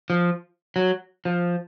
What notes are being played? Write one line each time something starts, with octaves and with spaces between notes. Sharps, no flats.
F3
F#3
F3